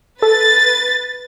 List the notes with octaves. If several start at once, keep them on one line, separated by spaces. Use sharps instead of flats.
A4 B4 A6